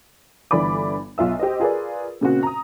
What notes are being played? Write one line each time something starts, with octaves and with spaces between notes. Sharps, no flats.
G1 D3 E3 D5 B5 D6
B1 F4 E5 E6
G4 C5 D#5
F4 G#4 A#4 B4 D5
A#2 C#3 C4 F#4
A#5 D#6